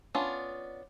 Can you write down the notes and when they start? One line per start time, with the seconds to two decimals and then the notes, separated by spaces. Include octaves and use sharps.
0.15 B3 C#4 D4 F4